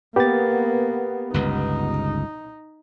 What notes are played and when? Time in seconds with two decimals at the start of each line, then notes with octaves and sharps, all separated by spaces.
0.16 A#3 B3 G4 A6
1.34 G1 C#2 D#4